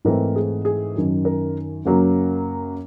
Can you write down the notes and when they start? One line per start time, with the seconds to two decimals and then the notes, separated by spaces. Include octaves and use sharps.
0.05 G#2 E3 A3 C4 A#4
0.36 G#4
0.65 G#4
0.95 F#2 D#3 F#3
1.25 A#4
1.85 F#2 C#3 F#3 A#3 C#4